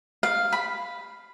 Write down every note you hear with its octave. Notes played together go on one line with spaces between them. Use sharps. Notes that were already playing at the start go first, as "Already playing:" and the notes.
F5
B5